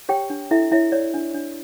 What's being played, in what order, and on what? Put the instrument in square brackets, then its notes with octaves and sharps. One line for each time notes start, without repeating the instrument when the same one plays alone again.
[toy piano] G4 C#5 G5
D4
E4 A4 E5
E4 C#5 E5
C#5 D5
D4
D4